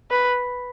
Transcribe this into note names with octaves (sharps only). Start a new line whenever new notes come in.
B4